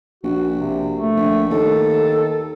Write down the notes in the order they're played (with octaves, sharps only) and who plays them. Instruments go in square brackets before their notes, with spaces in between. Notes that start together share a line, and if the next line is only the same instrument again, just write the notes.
[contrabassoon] A#1 [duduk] F#4
[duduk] C3
A3
[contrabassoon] A#1
[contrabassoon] D#2 [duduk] A4